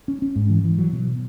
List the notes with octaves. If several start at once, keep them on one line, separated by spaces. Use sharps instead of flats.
C#4
C#4
G#2
E3
E3
F#3
B2